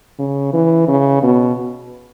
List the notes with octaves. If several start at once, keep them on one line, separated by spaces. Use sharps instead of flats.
C#3
E3
C#3
B2